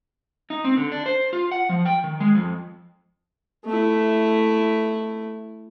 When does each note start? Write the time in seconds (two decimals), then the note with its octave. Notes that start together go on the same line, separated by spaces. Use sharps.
0.50 D#4
0.64 C4
0.77 D3
0.92 D4
1.06 C5
1.33 F4
1.52 F#5
1.69 F3
1.85 G5
2.04 D#3
2.20 G#3
2.35 F2
3.65 A3 E4